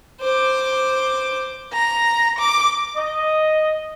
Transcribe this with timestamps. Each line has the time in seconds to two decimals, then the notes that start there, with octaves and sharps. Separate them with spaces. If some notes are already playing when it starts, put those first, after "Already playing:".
0.21 C5 D6
1.73 A#5
2.39 D6
2.97 D#5